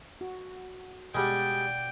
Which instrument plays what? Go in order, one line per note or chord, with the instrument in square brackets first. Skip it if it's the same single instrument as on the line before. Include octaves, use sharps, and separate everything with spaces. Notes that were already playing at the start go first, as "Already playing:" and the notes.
[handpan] F#4
[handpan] B2 D5 F#5 [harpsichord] G3 G#3 [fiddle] G5